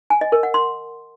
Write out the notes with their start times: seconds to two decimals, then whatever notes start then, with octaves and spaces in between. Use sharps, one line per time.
0.10 G#5
0.21 D#5
0.32 A#4
0.43 F#5
0.54 C6